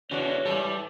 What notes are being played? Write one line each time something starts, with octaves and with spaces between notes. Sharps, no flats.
E2 C#3 C#4 D4 F#4 C#5
G#2 E3 G3 A4